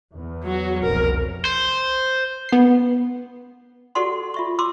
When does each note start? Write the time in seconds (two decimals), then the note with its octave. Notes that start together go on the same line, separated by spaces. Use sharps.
0.12 E2
0.43 F#3 F#4
0.83 F1 C2 B2 A#4
1.45 C5
2.49 B3 C7
3.95 F#4 G4 A4 D5 F#5 C6
4.34 F4 E5 C#6
4.59 C6 D6 E6